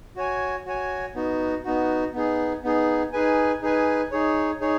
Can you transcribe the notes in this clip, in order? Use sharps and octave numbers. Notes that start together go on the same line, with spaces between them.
F#4 C#5 G#5
F#4 C#5 G#5
B3 D#4 F#4
B3 D#4 F#4
B3 D#4 G#4
B3 D#4 G#4
D#4 G#4 B4 G#5
D#4 G#4 B4 G#5
D#4 G#4 C#5
D#4 G#4 C#5